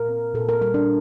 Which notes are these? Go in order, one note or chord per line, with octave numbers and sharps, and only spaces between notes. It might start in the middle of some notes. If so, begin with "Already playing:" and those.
Already playing: A#2 A#4
C4
A#2 A4
A#4
G3 A#4
D4